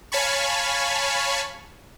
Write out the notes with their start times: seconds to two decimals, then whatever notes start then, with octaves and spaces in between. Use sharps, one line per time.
0.12 C#5 F5 G#5 A5 B5 C#6